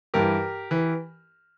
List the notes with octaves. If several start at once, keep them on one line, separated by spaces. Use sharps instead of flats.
G2 E3 G4 A#4
E3